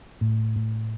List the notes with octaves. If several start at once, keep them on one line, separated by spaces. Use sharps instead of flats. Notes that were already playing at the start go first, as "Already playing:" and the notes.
A2
A2